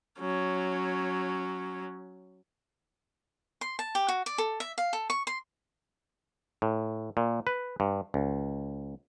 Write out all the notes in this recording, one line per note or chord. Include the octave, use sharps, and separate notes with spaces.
F#3 C#4
C6
A5
G4
F#4
D5
A4
E5
F5
A4
C#6
C6
A2
A#2
B4
G2
C#2